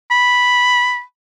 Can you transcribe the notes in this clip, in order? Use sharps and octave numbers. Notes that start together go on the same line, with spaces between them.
B5